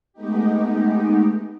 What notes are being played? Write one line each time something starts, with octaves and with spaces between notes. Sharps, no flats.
G#3 A3 B3 D#4 G4